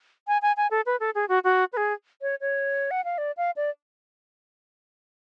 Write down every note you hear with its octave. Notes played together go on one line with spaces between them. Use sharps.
G#5
G#5
G#5
A4
B4
A4
G#4
F#4
F#4
B4
G#4
C#5
C#5
F#5
F5
D5
F5
D5